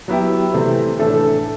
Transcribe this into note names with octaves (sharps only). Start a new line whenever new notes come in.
F#3 B3 E4 G4
C3 E3 A3 C4
A2 E3 A3 D4 A4